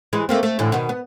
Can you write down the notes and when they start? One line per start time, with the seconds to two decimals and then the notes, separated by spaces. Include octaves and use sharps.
0.13 E3 G#3
0.29 A3 A#3 C4
0.43 A3
0.59 A2 D3 E3
0.72 B2 D#3
0.89 B3